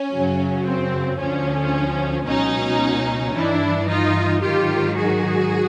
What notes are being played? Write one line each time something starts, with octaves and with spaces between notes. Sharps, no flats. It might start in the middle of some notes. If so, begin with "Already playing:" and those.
Already playing: C#4
F#2 C#3 F#3
C4
D2 D3 F3 C#4
C#2 B2 F#3 C#4 D#4
G2 E3 D4 E4
D#4 F4
G#2 D#3 F#3 F4 G4
F#4 G#4